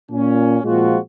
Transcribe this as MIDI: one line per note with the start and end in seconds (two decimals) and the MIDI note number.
0.11 0.59 46
0.11 0.59 61
0.64 0.98 46
0.64 0.98 53
0.64 0.98 56
0.64 0.98 60
0.64 0.98 65
0.64 0.98 66